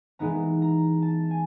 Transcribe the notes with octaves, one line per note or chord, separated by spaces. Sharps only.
E3 G#3 B3 D#4 A#5
A#5
A5
G#5